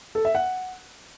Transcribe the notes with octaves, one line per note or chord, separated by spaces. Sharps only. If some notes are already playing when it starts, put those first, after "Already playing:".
A4
E5
F#5